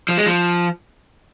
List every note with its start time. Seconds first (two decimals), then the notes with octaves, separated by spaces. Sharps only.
0.09 F3
0.18 G#3
0.26 F3